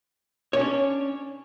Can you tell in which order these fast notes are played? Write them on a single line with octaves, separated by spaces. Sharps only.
C#5 C#4 D4